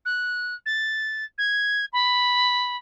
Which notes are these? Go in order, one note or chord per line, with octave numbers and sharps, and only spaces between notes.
F#6
A6
G#6
B5